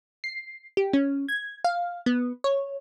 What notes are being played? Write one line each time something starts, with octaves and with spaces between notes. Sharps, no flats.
C7
G4
C#4
G#6
F5
B3
C#5